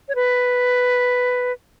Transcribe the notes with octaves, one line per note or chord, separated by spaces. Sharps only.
C#5
B4